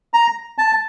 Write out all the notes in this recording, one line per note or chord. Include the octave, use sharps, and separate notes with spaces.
A#5
A5